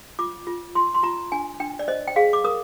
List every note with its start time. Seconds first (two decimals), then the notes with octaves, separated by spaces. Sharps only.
0.19 F4 D6
0.47 F4
0.75 F4 C6
0.94 C6
1.03 F4 A#5
1.32 D4 G#5
1.60 D4 G5
1.79 D5
1.88 C5 D#5
2.07 G5
2.16 G#4 F5
2.33 D6
2.44 A#4 D#6